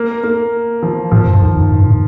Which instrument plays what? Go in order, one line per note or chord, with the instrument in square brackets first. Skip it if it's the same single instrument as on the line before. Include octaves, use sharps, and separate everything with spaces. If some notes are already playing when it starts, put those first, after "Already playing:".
Already playing: [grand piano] A#3
A#3
F3
[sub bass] A2 [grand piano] F3
[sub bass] G2
[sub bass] F2 [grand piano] D#3
[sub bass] F2
G2
A2